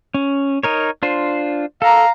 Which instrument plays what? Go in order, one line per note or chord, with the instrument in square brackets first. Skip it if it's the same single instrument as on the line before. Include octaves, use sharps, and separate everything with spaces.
[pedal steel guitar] C#4
D#4 A#4 C#5
D4 F4 C5
[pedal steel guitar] A4 [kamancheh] F5 A#5